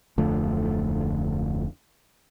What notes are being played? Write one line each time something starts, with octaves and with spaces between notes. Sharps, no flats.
D1 F2 D3 A3